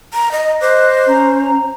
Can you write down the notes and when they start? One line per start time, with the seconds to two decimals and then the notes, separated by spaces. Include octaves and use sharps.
0.13 A#5
0.32 D#5
0.61 C5 D#5 D6 F#6
1.08 C#4 A#5